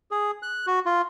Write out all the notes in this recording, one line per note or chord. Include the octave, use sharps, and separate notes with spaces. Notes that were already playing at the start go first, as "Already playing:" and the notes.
G#4
F#6
F#4
F4